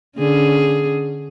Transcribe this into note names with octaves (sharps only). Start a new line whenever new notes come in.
D3 C#4 G#4